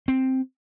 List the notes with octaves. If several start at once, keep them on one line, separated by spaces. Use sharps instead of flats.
C4